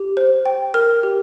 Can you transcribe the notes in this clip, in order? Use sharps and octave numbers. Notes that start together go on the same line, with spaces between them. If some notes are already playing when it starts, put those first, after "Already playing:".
Already playing: G4
C5
G5
A#4 F6
G4